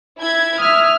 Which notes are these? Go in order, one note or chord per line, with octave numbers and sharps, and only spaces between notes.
E4 G#6
E5 D#6 F6